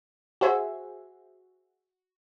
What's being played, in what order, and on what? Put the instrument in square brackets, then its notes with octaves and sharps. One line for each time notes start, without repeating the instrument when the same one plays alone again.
[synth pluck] F#4 G#4 C5 E5 G#5